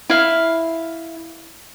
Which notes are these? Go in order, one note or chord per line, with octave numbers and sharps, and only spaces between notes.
E4 F5